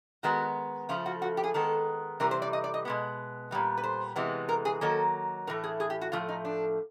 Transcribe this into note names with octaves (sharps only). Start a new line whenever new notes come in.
D#3 G#3 B3 F#4
C#3 F3 A3 F4
F#4
F#4
G4
G#4
D#3 G#3 B3 A4
C3 E3 G3 A#4
C5
D5
D#5
D5
D#5
B2 G#3 B3
A#2 G3 B3
B4
C5
C3 E3 G#3 B3
A#4
G#4
D#3 F#3 A#3 A4
A2 E3 A3 A#4
G#4
G#4
G4
F#4
A2 F3 A3 F4
D#4
D4